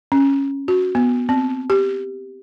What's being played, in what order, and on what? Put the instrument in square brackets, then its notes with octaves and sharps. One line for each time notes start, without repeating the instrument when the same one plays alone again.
[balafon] C#4
F#4
B3
C4
G4